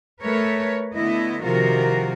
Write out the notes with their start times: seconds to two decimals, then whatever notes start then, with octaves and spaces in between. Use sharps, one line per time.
0.20 A3 A#4 B4 C#5
0.94 D3 A3 B3 E4 D#5
1.44 C3 D#3 F3 F4 F#4 A#4